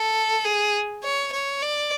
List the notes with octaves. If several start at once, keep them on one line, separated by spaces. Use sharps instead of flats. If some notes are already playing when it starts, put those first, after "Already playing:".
Already playing: A4
G#4
C#5
C#5
D5